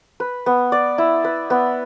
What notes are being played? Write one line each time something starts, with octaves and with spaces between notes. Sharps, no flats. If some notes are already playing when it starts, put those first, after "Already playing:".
B4
B3
D5
E4
B4
B3